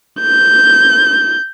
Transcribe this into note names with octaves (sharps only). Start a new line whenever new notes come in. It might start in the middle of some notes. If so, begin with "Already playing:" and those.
G6